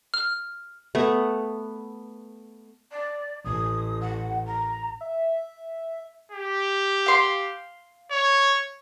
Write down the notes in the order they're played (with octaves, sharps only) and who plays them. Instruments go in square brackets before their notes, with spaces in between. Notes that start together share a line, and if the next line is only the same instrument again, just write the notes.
[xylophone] F6
[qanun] A3 B3
[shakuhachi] D5
[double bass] A1 [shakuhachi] D#6
[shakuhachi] F#5
A#5
[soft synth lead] E5
[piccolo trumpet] G4
[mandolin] F5 C6
[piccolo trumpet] C#5